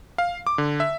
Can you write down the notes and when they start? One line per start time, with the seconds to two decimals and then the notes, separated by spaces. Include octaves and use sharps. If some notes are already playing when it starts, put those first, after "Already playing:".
0.18 F5
0.47 D6
0.58 D3
0.80 E5